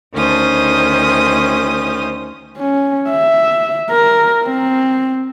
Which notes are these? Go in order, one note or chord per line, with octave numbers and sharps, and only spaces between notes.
D2 D#3 C#4 C5 D#6
C#4
E5
A#4
C4